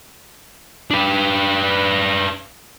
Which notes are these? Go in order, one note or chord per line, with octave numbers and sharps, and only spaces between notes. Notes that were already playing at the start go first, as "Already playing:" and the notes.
D4 B4